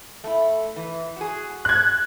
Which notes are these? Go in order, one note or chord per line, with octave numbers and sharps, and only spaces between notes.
A3 E4
E3
F#4 G#4
F#6 G#6